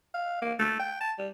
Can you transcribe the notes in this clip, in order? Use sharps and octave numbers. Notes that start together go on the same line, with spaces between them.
F5
A#3
A3
G5
A5
G3